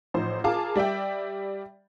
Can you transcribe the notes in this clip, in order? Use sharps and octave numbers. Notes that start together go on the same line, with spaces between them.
A1 F3 D#4 C5
F4 G#4 A#4 F5 A5 D6
G3 D5 E5 G5